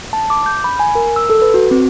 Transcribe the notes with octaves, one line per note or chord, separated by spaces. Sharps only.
A5
D6
G6
B5
G#5
A#4
E6
A4
B4
F#4
C4